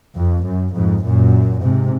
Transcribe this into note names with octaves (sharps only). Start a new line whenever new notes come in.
F2
F#2
F2 G#2
F#2 A#2
G#2 C3